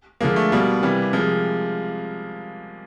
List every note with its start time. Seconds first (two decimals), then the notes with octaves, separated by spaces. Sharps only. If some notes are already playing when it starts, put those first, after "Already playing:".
0.21 D3 F3 G#3 A#3
0.36 A3
0.52 B2 G3 A#3
0.82 C3 E3 G3
1.13 C3 F3 G#3